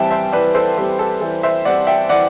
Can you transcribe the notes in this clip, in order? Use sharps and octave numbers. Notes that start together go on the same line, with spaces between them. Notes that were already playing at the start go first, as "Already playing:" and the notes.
Already playing: E3 G3 C4 E5 G5 A5
C5 E5
E3 B4 D5
A4 C5
G3 C4 G4 B4
A4
E3 A4
C5 E5
G3 C4 D5 F#5
E5 G5
E3 D5 F#5